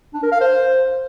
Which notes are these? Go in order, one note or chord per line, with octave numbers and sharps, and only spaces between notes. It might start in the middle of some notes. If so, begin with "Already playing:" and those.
D4
A#4
F5
C5